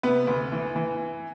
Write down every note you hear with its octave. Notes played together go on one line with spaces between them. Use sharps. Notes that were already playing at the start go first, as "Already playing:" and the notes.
C3 B3 B4
D2
E3
E3